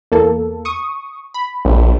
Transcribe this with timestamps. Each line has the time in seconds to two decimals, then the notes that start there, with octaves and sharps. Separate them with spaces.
0.12 E2 A#3 A4
0.65 C#6 D#6
1.34 B5
1.65 A#1